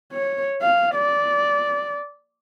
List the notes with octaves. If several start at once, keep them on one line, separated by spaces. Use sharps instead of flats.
C#5
F5
D5